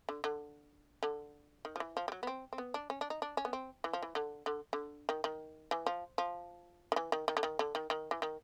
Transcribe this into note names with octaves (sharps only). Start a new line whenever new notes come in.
D3
D3
D3
D#3
F3
E3
F3
G3
F#3
B3
C4
C4
B3
D4
C#4
D4
D#4
D4
C#4
B3
C4
E3
F3
E3
D3
D3
D3
D#3
D#3
E3
F3
F3
D#3
E3
D#3
D#3
D3
D#3
D3
D#3
D#3
E3
D#3